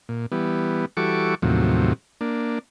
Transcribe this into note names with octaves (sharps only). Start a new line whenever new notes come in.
A#2
E3 G3 B3
E3 G3 F#4 A4 C#6 D6
D#2 A2 C3 F3 F#3
A#3 D4